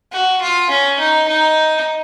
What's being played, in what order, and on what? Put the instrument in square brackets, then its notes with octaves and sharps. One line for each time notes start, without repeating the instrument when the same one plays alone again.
[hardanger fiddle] F#4
F4
C#4
D#4
D#4